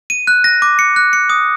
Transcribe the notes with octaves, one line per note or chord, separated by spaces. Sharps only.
D#7
F#6
A#6
D6
C#7
F#6
C#7
D#6